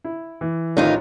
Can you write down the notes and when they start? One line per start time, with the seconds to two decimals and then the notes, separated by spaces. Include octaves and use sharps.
0.05 E4
0.41 E3
0.77 A1 D#3 F3 D#4 F4